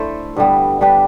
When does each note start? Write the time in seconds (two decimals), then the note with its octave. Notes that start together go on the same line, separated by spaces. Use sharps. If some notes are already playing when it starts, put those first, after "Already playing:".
Already playing: A3 D4 E4 A4 C5
0.36 G2 D3 G3 B3
0.81 G3 D4 G4 B4